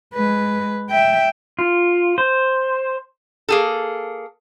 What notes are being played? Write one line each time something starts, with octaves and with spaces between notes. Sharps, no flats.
G#3 B4
E5 G5
F4
C5
A#3 G#4 A4